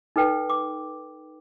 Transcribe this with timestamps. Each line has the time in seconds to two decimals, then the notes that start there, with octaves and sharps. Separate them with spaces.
0.16 D#4 A4 B4 G5
0.50 D6